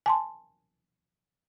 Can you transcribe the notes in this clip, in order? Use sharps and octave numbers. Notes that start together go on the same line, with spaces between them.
G#5 A5 C6